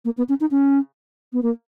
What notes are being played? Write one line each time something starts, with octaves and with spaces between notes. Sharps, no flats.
A#3
B3
C#4
D#4
C#4
B3
A#3